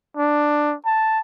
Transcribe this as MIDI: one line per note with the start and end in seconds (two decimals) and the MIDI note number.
0.17 0.74 62
0.86 1.20 81